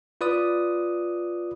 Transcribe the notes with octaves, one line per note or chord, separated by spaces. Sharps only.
F4 B4 D5 D#6